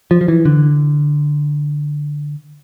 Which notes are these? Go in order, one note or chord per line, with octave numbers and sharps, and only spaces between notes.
F3
F3
E3
D3